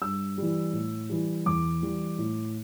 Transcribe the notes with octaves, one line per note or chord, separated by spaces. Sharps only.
G2 E6
E3 G3
A2
E3 G3
E2 D6
E3 G3
A2